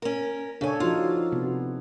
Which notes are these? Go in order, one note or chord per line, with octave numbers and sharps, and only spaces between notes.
C#4 A#4
C#3 D4 A4 C#5 G#5
F3 D#4 F4 F#4
C3 B3